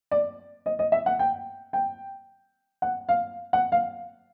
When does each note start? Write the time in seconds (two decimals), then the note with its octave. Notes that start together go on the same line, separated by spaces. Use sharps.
0.11 D5
0.66 D#5
0.79 D#5
0.92 E5
1.06 F#5
1.19 G5
1.73 G5
2.82 F#5
3.09 F5
3.53 F#5
3.72 F5